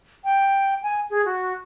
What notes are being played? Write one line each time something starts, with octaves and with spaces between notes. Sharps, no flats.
G5
G#5
G#4
F#4